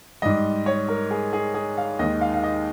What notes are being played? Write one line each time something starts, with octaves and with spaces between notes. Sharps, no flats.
G#2 G3 D#5
C#5
A#4
G#4
G#4
G#4
F5
D#2 D#3 G#3 D#5
F5
F5
D#5